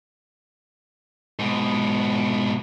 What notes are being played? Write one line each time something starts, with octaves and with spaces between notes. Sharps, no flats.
G#2 B2